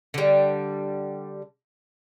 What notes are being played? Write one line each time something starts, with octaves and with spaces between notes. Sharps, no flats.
D3 G3